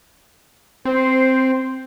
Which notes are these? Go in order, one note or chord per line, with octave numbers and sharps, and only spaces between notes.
C4 C5